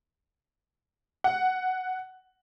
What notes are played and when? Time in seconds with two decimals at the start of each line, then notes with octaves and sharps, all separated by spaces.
1.24 F#5